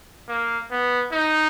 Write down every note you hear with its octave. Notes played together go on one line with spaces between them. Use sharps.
A#3
B3
D#4